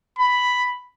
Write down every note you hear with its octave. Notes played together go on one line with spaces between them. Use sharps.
B5